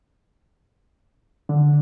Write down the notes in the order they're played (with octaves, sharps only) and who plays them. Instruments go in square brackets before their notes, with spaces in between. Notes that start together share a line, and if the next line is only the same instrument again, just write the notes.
[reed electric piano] D3